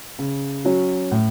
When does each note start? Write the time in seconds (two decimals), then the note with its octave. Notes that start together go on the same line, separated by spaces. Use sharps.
0.19 C#3
0.65 F#3 C#4 F#4
1.11 A2